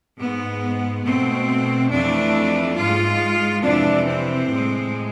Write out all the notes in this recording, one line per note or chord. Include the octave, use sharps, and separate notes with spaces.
G#2 G#3 B3
B2 A3 C4
F2 E3 A3 D4
G#2 G#3 F4
F2 C3 E3 D4
C4
A2 G#3